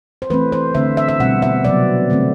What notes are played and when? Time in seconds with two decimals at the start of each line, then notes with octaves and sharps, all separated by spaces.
0.22 C5
0.30 E3 A3 C4 B4
0.52 C5
0.75 D3 A3 C4 E5
0.97 E5
1.09 E5
1.20 B2 G3 C4 F#5
1.42 E5
1.64 C3 F#3 B3 D5
2.10 D3 A3 C4